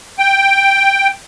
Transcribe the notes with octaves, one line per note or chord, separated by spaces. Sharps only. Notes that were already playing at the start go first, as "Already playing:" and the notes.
G5